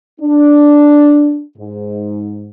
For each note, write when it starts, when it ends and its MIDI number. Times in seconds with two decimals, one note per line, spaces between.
0.20 1.42 62
1.58 2.50 44